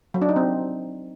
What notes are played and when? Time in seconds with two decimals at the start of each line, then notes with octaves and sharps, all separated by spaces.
0.14 F#3
0.22 D4
0.29 D#4
0.36 C4